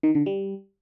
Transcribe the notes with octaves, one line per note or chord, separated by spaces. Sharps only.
D#3
D3
G3